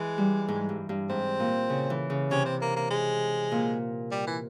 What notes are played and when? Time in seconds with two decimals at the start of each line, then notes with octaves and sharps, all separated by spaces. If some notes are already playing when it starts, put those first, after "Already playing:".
Already playing: E3 G#3
0.18 G3
0.48 G#2
0.69 G2
0.89 G2
1.09 G#2 C4
1.40 A#2
1.69 C#3
1.90 E3
2.10 C#3
2.31 C3 C#4
2.45 C4
2.61 A#3
2.76 A#3
2.91 G#3
3.52 A#2
4.12 G3
4.27 E3